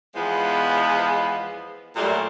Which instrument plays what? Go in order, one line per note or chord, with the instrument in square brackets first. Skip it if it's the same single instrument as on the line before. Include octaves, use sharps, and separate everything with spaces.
[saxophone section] E2 F3 G#3 B3
A#2 F#3 G3 A3